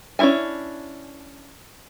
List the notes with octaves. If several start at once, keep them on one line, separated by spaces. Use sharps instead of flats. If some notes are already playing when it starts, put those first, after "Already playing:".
C#4 D4 E4 E5 G#5